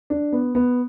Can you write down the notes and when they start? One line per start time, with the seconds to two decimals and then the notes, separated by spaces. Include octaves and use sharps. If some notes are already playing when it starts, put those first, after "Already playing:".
0.10 D4
0.32 B3
0.55 B3